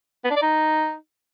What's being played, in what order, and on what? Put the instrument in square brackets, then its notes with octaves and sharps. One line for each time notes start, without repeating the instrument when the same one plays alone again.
[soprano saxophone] B3
D4
D5
D#4